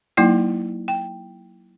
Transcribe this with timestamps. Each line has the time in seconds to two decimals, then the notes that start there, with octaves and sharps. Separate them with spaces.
0.17 F#3 A#3 D#4 E4 G5
0.88 G5